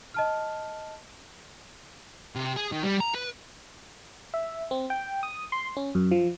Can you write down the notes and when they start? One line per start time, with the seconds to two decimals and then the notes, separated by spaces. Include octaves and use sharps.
0.14 D#5 A5 F6
2.36 C3
2.56 G#4
2.72 D#3
2.83 G3
3.00 A#5
3.14 B4
4.34 E5
4.71 C4
4.90 G5
5.23 D#6
5.52 C6
5.77 C#4
5.95 F#2
6.11 F3